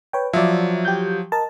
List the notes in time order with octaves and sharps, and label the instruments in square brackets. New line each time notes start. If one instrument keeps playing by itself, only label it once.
[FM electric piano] B4 C#5 G5
[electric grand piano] F3 F#3 [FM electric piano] D5 E5
[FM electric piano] G4 G6
A#4 D#5 A5